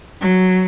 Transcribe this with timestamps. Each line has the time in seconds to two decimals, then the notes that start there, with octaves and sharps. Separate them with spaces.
0.22 F#3